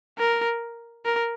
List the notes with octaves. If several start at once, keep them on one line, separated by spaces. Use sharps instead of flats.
A#4
A#4